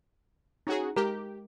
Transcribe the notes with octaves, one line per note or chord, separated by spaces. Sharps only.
C#4 D#4 F#4 G#4
G#3 G4 A#4 A#5